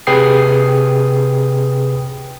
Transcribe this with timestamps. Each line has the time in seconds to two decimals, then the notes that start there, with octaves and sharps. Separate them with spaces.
0.07 C3 G#4 B4 G5 D#6 C7